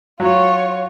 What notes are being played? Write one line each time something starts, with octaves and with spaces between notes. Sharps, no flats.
F#3 F4 C#5